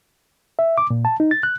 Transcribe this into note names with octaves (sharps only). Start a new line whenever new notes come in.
E5
D6
A#2
A5
D#4
A6
F#6